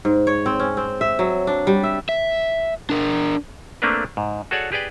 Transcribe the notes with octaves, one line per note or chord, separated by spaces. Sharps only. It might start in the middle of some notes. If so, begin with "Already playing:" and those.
G#2
C#5
C4
C#4
C4
E5
F#3
D4
G3
E5
E5
D4 A#4
A3 A#3 C4 D4 A#4 B4
G#2
F#4 G#4 A4 C#5 D5 F#5
G4 G#4 B4 D5 G5